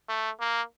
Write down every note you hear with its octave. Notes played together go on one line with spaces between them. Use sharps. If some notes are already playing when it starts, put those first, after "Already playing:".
A3
A#3